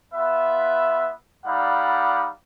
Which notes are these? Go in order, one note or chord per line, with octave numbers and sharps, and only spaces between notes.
B3 F4 B4 E5
G3 D#4 D5 F5 F#5 B5